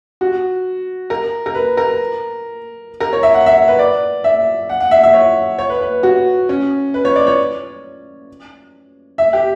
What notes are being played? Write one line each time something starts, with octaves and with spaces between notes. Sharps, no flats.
F#4
A#4
A#4
B4
A#4
A#4
C#5
E5
F#5
E5
B4
D5
E5
F#5
F#5
E5
E5
C#5
C#5
B4
B4
F#4
C#4
B4
C#5
D5
C#5
E5
G4